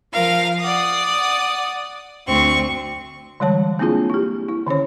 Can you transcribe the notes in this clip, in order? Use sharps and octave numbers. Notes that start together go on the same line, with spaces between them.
F3 A#4 F5
D5 F#5 D#6
D2 C4 C#6
D3 E3 G3 G#3 C#5 A5
A#3 C4 D4 E4 F4 G#4
E4 G4
E4
D3 D#3 C#4 C#5